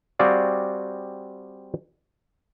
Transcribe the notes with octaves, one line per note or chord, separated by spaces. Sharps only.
G3 C4 F#4 G#4 D5 F5